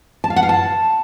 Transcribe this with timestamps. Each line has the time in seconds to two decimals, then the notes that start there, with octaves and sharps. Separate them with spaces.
0.24 A5
0.30 F5
0.36 F#5
0.43 F5
0.49 A5